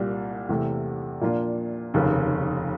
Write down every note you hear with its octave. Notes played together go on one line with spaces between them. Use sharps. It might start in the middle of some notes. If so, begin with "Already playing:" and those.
Already playing: C2 A#2 G3
E2 C3 E3 A3
A#2 F3 A#3 D4 F4
F1 D#2 C#3